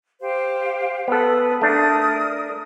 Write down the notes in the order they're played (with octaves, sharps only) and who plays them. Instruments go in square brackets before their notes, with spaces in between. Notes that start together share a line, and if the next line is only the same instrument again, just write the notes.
[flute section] G4 C5 F5
[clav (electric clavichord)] B3 A4 [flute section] B4 D#6
[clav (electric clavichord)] A3 D4 [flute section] A#4 D#6